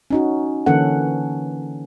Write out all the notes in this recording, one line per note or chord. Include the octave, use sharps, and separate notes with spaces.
C#4 D#4 F#4
D3 E3 A#3 C#4 A4 F#5